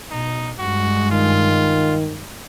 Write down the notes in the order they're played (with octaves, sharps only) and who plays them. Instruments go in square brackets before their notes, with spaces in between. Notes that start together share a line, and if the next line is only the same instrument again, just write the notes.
[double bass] B2 [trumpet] D#4
[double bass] G2 G#3 [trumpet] F#4
[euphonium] D#3 [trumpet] F4